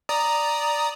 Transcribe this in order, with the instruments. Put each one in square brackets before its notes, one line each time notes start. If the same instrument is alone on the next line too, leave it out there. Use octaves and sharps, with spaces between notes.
[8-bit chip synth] D5 A#5 D#6